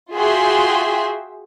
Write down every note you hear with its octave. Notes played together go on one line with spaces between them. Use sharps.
F4 F#4 G#4 E5 G5 C6